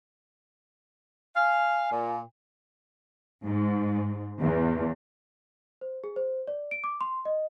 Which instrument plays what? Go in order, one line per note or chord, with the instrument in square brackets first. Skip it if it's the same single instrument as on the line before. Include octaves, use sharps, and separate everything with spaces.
[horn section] F5 [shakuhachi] G#5
[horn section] A#2
[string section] G#2
E2
[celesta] C5
G#4
C5
D5
D7
D6
C6
D#5